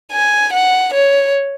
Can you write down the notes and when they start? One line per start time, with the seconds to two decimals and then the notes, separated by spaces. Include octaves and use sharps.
0.12 G#5
0.53 F#5
0.94 C#5